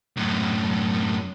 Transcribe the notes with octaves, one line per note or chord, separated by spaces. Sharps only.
F#2 A2